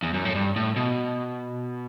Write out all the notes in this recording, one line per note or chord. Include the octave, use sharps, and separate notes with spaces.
E2
F#2
A2
G2
A2
B2